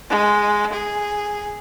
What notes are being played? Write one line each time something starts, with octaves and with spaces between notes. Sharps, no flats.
G#3
G#4